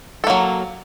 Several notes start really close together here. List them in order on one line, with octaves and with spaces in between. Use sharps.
A4 A#3 F#3